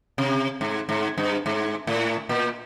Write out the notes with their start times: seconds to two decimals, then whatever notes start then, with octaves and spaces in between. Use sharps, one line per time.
0.18 C3
0.61 G#2
0.89 G#2
1.18 G2
1.46 G#2
1.87 A2
2.29 A#2